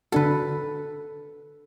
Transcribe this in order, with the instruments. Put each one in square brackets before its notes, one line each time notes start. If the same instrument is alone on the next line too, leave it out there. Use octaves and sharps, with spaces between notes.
[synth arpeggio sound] D3 D4 F#4 [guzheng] A4 B4